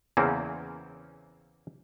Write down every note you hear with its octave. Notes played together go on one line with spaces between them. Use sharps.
E2 C#3 E3 A#3 C4 C#4